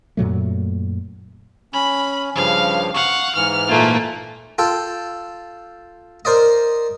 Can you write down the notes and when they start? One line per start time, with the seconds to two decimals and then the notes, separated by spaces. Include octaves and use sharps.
0.17 F#2 A#2 F#3 A3
1.74 C#4 B5
2.36 G2 C#3 F3 F5
2.94 F5 F#5 C#6
3.35 G#2 E3 F6
3.68 A#2 A3 A#3 F4
4.58 F4 A4 G5
6.25 A#4 C5 D5 D#5